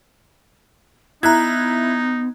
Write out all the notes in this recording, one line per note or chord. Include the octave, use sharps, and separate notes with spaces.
B3 D#4 E4 A#5 F#6 G#6